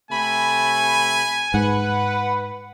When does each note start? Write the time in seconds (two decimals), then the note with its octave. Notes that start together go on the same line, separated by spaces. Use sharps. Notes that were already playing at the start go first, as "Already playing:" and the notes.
0.11 C3 A3 G#5 B5
1.54 G#2 B4 F#5